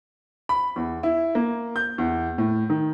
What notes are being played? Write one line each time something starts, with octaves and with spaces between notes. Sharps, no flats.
B5
E2
E4
A#3
G6
E2
A2
D#3